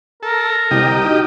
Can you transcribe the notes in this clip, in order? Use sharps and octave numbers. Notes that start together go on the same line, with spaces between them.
A4 A#4
C2 G4 D#5
D#4 F#4